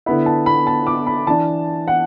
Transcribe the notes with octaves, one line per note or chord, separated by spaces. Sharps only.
D3 B3 E4 B5
A5
B5
A5
D6
B5
E3 D4 A5
F#5